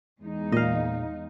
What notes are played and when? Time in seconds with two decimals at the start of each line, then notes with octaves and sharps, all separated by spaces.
0.21 E2 G#3 D#4
0.52 A#2 D#5 F5